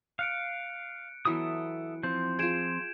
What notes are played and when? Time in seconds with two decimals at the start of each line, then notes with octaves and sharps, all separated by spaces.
0.19 F5 F#6 C#7 D7
1.25 E3 F#3 B3 A4 E5 D#6
2.03 F3 C4 G6
2.39 F4 G#4 G#6 D7 E7